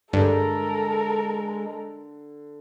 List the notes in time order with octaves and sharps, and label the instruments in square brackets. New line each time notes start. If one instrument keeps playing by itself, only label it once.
[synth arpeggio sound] G2 [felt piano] D3 [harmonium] G#3 [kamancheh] A4 A#4